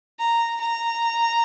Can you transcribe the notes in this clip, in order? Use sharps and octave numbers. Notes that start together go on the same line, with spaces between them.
A#5
A#5